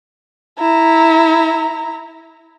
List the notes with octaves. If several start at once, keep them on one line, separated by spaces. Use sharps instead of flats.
E4 A#5